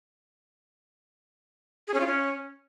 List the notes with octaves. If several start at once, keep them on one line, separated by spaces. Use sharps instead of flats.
G#4
C#4
F4
C#4